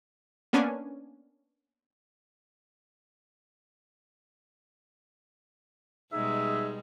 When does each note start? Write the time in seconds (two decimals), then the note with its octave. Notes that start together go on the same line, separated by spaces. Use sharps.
0.53 A#3 B3 C#4 D4 G#5
6.12 B2 G3 G#3 D#4 G#4 E5